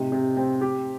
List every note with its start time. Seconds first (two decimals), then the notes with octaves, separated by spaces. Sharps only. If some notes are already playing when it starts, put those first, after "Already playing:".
Already playing: A2 C3 D#4
0.12 C3
0.37 C4
0.61 G4